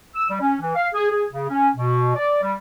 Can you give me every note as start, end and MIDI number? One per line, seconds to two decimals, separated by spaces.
0.16 0.29 88
0.30 0.40 55
0.41 0.56 61
0.61 0.75 52
0.76 0.88 77
0.94 1.08 68
1.11 1.25 68
1.32 1.49 49
1.49 1.69 61
1.76 2.16 47
2.16 2.40 74
2.42 2.55 55